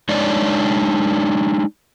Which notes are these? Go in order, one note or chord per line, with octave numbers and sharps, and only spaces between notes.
G#3 D4 D#4 C#5 D5